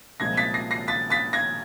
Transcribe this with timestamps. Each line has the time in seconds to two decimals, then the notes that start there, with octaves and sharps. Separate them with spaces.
0.20 C2 A#2 F3 G#3 G#6 A#6
0.37 A6 B6
0.54 A#6 C7
0.71 A#6 C7
0.88 A6 B6
1.10 A6 B6
1.33 G#6 A#6